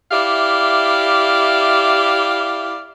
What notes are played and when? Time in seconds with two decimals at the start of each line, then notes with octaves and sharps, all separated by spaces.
0.12 E4 G4 D5 E5 F5